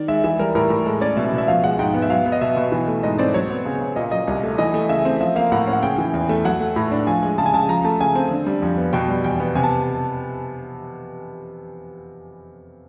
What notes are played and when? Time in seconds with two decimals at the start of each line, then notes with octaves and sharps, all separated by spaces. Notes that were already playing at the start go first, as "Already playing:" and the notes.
Already playing: D#3 D5
0.08 G#3 E5
0.24 E3 E5
0.39 G3 A#4
0.55 A2 A#4
0.70 A2
0.86 G#3 A4
1.01 C#4 D5
1.17 B2 E5
1.33 B2
1.38 E5
1.48 F3 F5
1.63 G#3 F#5
1.79 G#2 G5
1.94 B3
2.02 E5
2.10 F#3 F5
2.26 B3
2.32 D#5
2.41 B2 E5
2.57 B2
2.72 E3
2.88 A3
3.03 G#2 D#5
3.19 C4 D5
3.34 F#3 C#5
3.50 B3
3.65 C#3
3.81 C#3
3.96 A#2 D#5
4.11 F#3 D#5
4.27 C2
4.43 A3
4.58 E3 D#5
4.74 A3
4.89 C#3 E5
5.05 C4
5.20 F3 E5
5.36 A#3 F5
5.52 A2 F#5
5.67 C#4
5.73 F#5
5.82 C#3 G5
5.98 E3
6.14 E2
6.29 A3
6.45 F#3 F#5
6.60 A3
6.76 A2
6.91 D4
7.07 F3 G#5
7.23 G#3
7.38 C#3 A5
7.46 G#5
7.54 C#3 A5
7.69 F3 A#5
7.84 A3 A5
8.00 C#3 G#5
8.15 C4
8.31 D3
8.47 G3
8.62 F2
8.77 B3
8.93 B2 G5
9.09 G3
9.24 E2 G5
9.40 B3
9.55 C3 G#5
9.63 A5